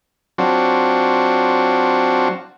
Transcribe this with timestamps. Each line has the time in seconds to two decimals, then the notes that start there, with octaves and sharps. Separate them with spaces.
0.38 F#3 C4 D4 F4 F#4